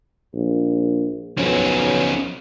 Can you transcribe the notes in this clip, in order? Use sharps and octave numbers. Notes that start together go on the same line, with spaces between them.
A#1
B1 F3 C#4